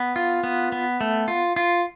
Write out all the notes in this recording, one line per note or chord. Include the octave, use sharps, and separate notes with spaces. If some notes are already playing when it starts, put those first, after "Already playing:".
Already playing: B3
F4
B3
B3
A3
F4
F4